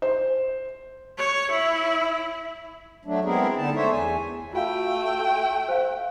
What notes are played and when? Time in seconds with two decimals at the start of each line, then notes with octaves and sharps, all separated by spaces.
0.02 C5
1.18 C#5
1.52 E4
3.05 F#3 A3 D4
3.24 G#3 B3 C4 E4 G#4 A#4
3.57 D3 B3 D#4 A5
3.76 A3 D4 A4 C5 C#5 E5
3.91 E2 G#5
4.53 A3 F4 F#4 F5 G5
5.69 C5 F5